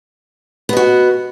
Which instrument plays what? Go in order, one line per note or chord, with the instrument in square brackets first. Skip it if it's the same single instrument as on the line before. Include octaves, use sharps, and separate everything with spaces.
[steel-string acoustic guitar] B3
D#5
F#4